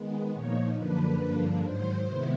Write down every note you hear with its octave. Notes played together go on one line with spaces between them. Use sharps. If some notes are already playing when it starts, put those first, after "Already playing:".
Already playing: D#3 G#3 B3
A#2 F3 A#3 D#4 C#5
F#2 D3 F3 A#3 D4 B4
G2 D3 F3 A#3 D4
G#2 D#3 F#3 C5
C3 D#3 G#3 B3 E4